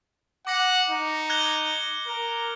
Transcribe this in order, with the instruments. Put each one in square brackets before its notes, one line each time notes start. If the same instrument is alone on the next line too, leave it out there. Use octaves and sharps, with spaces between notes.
[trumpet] F#5 [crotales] D6 A#6 C#7
[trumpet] D#4
[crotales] F#6 G#6 G7
[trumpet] A#4